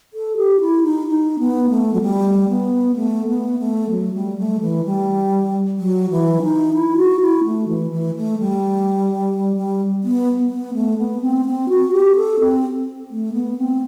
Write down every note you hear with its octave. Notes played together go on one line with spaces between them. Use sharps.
A4
G4
E4
D#4
D#4
B3
A3
F#3
G3
B3
A3
B3
A3
F#3
G3
A3
E3
G3
F#3
E3
D#4
E4
F#4
E4
A3
E3
E3
A3
G3
G3
B3
B3
A3
B3
C4
C4
F#4
G4
A4
C4
A3
B3
C4